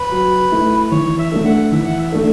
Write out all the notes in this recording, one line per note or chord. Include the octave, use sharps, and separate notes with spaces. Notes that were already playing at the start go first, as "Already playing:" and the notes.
Already playing: B4
F#3
A3 E4
E3 C#5
E5
A3 D4 A4
F#5
E3 E5
F#5
E5
A3 D4 A4